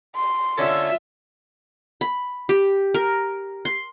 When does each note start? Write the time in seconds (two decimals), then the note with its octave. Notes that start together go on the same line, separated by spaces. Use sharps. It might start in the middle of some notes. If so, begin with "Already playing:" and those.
0.15 C6
0.58 D3 C#4 F4 A4 E5
2.01 B5
2.49 G4
2.94 A#4
3.65 C6